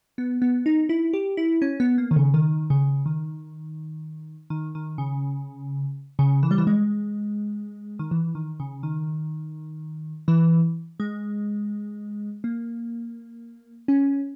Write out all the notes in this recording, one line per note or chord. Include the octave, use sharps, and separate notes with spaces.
B3
B3
D#4
E4
G4
E4
C#4
B3
A#3
D#3
C#3
D#3
C#3
D#3
D#3
D#3
C#3
C#3
E3
G3
E3
G#3
D#3
E3
D#3
C#3
D#3
E3
G#3
A#3
C#4